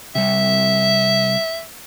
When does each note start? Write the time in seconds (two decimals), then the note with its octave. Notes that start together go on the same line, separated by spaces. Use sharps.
0.15 C3 G3 E5